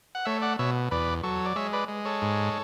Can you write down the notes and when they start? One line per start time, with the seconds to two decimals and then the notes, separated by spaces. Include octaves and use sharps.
0.15 F#5
0.25 A3 C#5 E5
0.42 D5 F#5
0.59 B2 C#5 E5
0.91 E2 B4 D5
1.23 F#3 A4 C#5
1.45 D5
1.56 G#3 C#5 E5
1.73 B4 D5
1.88 G#3
2.05 A4 C#5
2.22 G#2